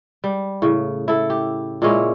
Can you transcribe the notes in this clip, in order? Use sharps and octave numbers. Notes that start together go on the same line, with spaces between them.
G3
A2 C#3
E4 A4
G4
A#2 G#3 C#4 E4